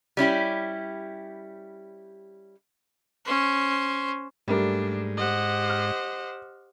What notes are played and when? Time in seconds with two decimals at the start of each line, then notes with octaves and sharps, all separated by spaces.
0.17 G3 C#4 E4 G4
3.25 C#4 C5
4.48 G#2 G3 A3 D4 A#4
5.17 G4 C5 D#5 F#5
5.70 F6